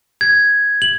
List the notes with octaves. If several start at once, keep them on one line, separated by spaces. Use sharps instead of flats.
G#6
F#7